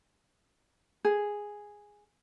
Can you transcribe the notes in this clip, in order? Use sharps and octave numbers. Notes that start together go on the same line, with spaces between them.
G#4